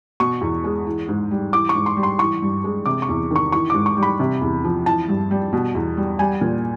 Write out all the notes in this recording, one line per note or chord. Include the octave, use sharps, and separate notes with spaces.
B2 C#6
E2
G#3
E3
G#2
G3
E3 D6
C#6
G#2
C6
G3
C6
E3 C#6
G2
G#3
C3 D6
C#6
E2
D#3 C#6
E3 C#6
G#2 D6
C#6
G3
B5
C3
E2
F3
E3 A5
G2
G3
B2
E2
G3
G3 G#5
A#2